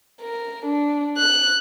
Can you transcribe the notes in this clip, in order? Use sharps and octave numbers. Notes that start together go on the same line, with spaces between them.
A#4
D4
F#6